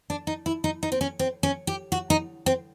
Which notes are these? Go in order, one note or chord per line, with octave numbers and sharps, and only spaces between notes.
D4
D#4
E4
D#4
D#4
C4
C#4
C4
C#4
G4
F#4
D#4
C4